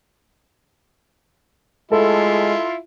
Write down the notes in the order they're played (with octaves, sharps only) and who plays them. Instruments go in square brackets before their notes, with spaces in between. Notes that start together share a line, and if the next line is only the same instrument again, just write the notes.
[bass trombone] G#3 [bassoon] A3 [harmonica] E4 F4 [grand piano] A4